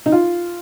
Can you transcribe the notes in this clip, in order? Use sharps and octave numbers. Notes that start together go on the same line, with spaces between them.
D#4
F4